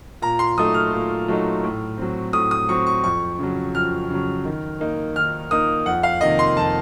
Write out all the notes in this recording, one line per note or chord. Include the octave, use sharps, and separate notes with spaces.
A#2 A#5
C6
F#3 A3 D#4 D#6
F6
A#2
F#3 A3 D#4
A2
F#3 C4
A2 D#6
D#6
F#3 C4 C#6
C#6
F2 C#6
C#3 F#3
F2 F6
C#3 F#3
D#3
A#3 D#4
D#3 F6
A#3 D#4 D#6
F2 F#5
F5
C3 D#3 A#3 D#5
C6
F2 A5